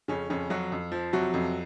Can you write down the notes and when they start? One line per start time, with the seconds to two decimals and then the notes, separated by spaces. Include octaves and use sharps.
0.08 F2 C#3 C#4
0.30 F2 C#3 C#4
0.50 F2 F#3 F#4
0.72 F2
0.92 F3
1.13 C3 F#3 F#4
1.34 F2